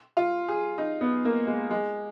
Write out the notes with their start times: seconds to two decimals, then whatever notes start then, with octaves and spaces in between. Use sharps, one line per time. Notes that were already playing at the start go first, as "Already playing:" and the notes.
0.17 F4
0.48 G#4
0.78 D#4
1.01 B3
1.25 A#3
1.47 G#3
1.71 G#3